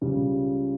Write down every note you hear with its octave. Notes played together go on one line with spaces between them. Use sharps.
C#2 C#3 G3